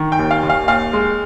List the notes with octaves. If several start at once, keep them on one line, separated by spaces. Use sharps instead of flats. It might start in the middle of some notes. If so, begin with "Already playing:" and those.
Already playing: D#3
G5
D#2
F5
D#2
F5
D#2 F5
G#3